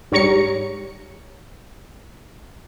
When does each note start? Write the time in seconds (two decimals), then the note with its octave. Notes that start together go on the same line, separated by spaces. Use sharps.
0.12 G#2 G3 C#5 A#5 C#6 C#7